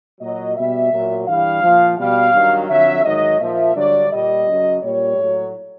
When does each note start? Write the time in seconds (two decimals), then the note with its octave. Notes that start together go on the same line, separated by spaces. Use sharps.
0.20 A#2 F#3 D#5
0.56 B2 G3 E5
0.92 A#2 F#3
1.27 G2 E3 G3 F5
1.62 A#2 F3
1.98 B2 G3 F5
2.33 G2 D#3 F#3
2.69 F2 D3 F#3 E5
3.04 G#2 D#3 F#3 D#5
3.40 A#2 F3 E5
3.75 G2 D3 F#3 D5
4.10 A#2 G3 D#5
4.46 F#2 C#3 F#3
4.82 A#2 G3 C#5
5.17 A2 F#3